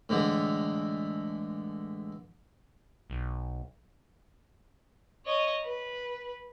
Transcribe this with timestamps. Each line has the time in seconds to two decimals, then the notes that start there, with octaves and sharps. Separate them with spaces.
0.09 A2 D3 E3 G#3
3.10 B1
5.26 C#5 D#5
5.64 B4